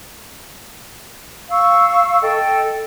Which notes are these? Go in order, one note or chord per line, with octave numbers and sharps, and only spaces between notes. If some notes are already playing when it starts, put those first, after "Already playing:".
F5 C#6 E6
A4 D#5 G5